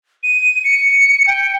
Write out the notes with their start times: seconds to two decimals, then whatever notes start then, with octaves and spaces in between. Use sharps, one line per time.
0.23 D#7
0.64 C#7
1.27 G5